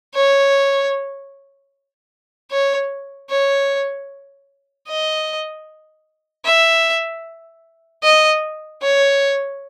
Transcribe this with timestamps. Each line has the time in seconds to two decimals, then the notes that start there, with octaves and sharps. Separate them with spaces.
0.15 C#5
2.51 C#5
3.30 C#5
4.88 D#5
6.45 E5
8.04 D#5
8.82 C#5